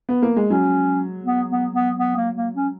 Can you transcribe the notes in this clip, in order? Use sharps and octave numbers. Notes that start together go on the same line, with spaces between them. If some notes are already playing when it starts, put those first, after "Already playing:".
B3
A#3
G#3
F#3 C#4
B3
B3
B3
B3
A#3
A#3
C#4